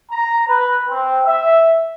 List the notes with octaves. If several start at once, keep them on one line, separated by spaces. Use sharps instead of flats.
A#5
B4
C4
E5